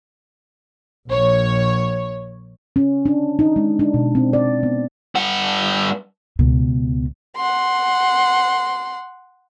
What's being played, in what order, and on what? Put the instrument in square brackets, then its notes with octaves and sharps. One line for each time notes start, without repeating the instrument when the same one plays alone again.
[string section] A#1 C#5
[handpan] C#4
D4
D#4
G#3
D4
B2
C4
D5
B3
[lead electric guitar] G2 F#5
[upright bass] C#2 B2
[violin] F#5 C6